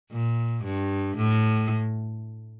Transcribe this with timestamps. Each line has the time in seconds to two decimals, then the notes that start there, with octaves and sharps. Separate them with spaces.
0.12 A#2
0.65 G2
1.17 A2